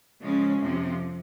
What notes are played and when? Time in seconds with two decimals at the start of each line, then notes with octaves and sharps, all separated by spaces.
0.22 C#3 F3 G#3 C#4
0.60 F2 C3 F3